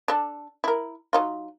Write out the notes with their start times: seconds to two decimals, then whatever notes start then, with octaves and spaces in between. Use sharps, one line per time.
0.08 D4 A4
0.64 E4 A#4
1.13 F#3 D#4 F4